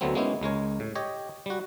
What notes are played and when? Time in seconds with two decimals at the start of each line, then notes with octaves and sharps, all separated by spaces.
0.01 D2 D3 F#3 A3 B3 C4
0.15 G#3 A#3 B3 C#4 D#4 E4
0.41 C#2 G#3 A#4 C#5
0.80 A2
0.95 G4 C#5 D#5
1.46 G3 F#4